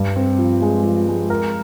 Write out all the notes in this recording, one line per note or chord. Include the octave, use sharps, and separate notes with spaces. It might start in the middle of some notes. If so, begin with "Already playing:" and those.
Already playing: G2
C4
F3
G#3
F3
G#3
A#4